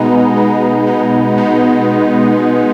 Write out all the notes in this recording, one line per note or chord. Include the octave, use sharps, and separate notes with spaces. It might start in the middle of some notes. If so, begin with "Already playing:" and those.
Already playing: B2 G#3 B3 D#4
B2 G#3 B3 D#4
B2 G#3 B3 D#4
B2 G#3 B3 D#4